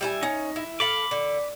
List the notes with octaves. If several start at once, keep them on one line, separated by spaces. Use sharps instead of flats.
G3 E4 G#5
C#4 D#4
E4
A4 F5 B5 D6
D3